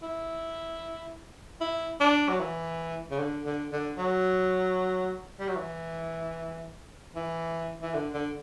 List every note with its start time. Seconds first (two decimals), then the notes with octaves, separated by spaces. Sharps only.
0.02 E4
1.61 E4
2.00 D4
2.29 F#3
2.40 E3
3.11 C#3
3.19 D3
3.46 D3
3.72 D3
3.98 F#3
5.40 G3
5.48 F#3
5.56 E3
7.15 E3
7.82 E3
7.94 D3
8.14 D3